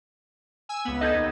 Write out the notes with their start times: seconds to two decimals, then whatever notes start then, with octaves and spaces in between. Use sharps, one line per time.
0.69 G#5 E6
0.85 C#2 B3
1.01 B3 D#4 A4 D#5 G6 G#6
1.13 D#2